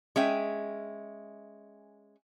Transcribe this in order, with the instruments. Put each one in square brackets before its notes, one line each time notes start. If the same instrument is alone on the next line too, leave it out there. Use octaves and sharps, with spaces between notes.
[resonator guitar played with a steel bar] G#3 C#4 E5 G5